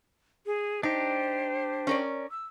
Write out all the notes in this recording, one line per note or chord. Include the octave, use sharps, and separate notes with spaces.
G#4
D4 D#4 G4 C5
C#4 A#4 D5
E6